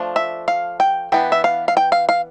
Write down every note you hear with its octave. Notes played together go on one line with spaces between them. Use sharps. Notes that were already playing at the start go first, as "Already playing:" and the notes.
Already playing: F3 A3 D4
E5
F5
G5
E3 B3 D4 G5
E5
F5
F5
G5
F5
F5